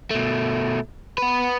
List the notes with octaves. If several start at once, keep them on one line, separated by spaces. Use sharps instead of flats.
B2 A3
B3 B4